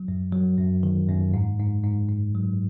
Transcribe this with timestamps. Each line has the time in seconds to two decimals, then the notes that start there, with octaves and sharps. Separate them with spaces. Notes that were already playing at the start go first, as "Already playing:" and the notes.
Already playing: F#3
0.08 F#2
0.33 F#3
0.58 F#2
0.83 D#3
1.09 F#2
1.34 G#2
1.59 G#2
1.83 G#2
2.09 G#2
2.35 F#3